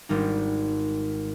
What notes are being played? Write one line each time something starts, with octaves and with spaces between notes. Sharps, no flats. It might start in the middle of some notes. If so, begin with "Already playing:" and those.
G#1 G3 D#4